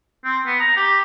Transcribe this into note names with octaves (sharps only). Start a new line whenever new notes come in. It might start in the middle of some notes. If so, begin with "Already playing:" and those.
C4
B3
A#5
G4